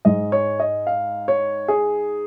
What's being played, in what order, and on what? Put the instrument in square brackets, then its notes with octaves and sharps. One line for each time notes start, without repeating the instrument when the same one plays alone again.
[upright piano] G#2 G#3 D#5
C#5
D#5
F5
C#5
G#4